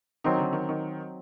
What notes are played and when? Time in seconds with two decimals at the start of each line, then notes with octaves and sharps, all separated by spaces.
0.24 D#3 F#3 C4 D#4
0.38 D3
0.53 D#3
0.69 D#3